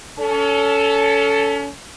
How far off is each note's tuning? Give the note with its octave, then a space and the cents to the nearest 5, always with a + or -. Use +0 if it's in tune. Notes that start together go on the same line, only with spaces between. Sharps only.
C#4 +30 A4 +0